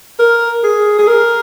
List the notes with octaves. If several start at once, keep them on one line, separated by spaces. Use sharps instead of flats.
A#4
G#4
G#4
A#4